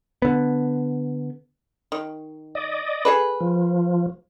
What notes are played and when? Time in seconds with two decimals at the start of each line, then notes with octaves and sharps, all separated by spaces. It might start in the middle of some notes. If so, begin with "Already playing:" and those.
0.22 D3 B3
1.92 D#3
2.55 D5 D#5
3.05 G#4 A4 B4
3.41 F3